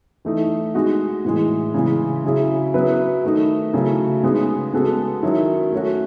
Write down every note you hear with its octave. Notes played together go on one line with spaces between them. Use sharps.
E3 A3 D#4
G#3 D#4 F#4
A2 E3 G#3
C#3 E3 G#3
C#3 F#3 C#4 E4 G#4
F#3 B3 E4 B4
D#3 A3 D#4
C#3 F#3 A3 E4
C#3 G#3 B3 D#4
G#3 B3 F#4 A4
D#3 F#3 C#4 E4
A3 C#4 F#4